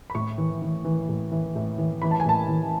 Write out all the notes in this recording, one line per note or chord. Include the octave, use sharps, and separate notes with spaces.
B5
A2 C#6
E3
E3
E3
A2
E3
A2
E3
E3 B5
A5
G#5
A2 A5
E3